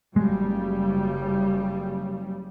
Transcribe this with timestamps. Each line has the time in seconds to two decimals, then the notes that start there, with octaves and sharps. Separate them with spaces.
0.16 F#1 C#3 G3 G#3